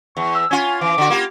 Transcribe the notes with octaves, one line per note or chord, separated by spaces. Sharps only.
E2 C#6
E6
C#4 F4 G#5
E3 D6
D3 F#4
A#3 F4 G4